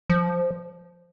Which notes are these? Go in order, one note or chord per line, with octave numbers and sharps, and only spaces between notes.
F3